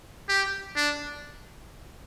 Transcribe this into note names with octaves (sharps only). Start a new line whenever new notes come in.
G4
D4